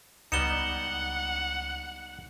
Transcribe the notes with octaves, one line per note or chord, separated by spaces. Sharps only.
C#2 G3 B3 D#4 F#5 C#7 E7 G7